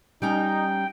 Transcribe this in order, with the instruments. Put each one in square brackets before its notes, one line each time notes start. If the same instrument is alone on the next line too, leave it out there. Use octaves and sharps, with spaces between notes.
[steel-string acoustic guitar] G3 C#4 A#5 [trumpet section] D#4 [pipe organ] G5